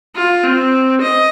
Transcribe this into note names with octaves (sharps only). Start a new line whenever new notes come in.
F4
C4
D#5